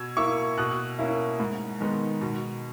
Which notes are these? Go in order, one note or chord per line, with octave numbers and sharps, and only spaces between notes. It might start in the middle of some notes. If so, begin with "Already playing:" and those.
Already playing: B2 E6 G#6
A#3 E4 C#6 E6
B2 D#6 F#6
A#3 C#4 E4
G#2
D#3 G#3 B3 D#4
B2